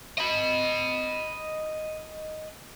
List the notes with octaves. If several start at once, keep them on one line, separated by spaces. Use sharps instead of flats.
D#5 B5